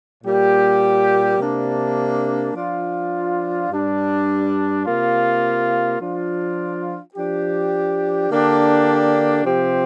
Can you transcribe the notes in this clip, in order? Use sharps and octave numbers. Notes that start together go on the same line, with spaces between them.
A#2 G3 A#3 G4
C3 A#3 D4
F3 D4 F4
G2 G3 D4
C3 A#3 F4
F3 D4 F4
F3 D4 G4
D3 A#3 D4 G4
C3 F3 C4 G4